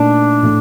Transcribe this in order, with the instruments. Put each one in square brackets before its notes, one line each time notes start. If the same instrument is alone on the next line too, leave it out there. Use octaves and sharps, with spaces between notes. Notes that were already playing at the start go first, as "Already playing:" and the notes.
Already playing: [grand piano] A#2 A3 D#4 [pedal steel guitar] D4
[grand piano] A2 A3